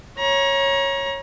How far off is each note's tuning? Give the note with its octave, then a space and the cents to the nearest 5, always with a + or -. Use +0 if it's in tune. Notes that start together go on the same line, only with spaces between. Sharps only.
C#5 -10 A#5 +30